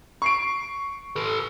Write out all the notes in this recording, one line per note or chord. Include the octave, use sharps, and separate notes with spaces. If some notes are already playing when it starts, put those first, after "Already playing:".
C#6 C7 D7
A4 B4